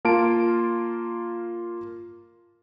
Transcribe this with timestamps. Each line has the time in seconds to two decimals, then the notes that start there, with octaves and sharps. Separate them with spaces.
0.05 A#3 F4 A5 D7